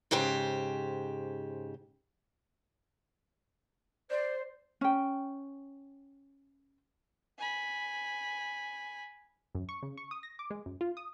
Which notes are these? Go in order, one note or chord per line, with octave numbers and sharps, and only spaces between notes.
G#2 C#3 G4 C5
C5 D5
C#4 G5
G#5 B5
F#2
C#6
C#3
C#6
D#6
A#6
D6
G#3
F#2
F4
D#6